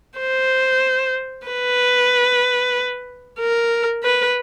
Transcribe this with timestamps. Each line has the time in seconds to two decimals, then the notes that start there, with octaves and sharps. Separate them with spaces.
0.19 C5
1.47 B4
3.40 A#4
4.04 B4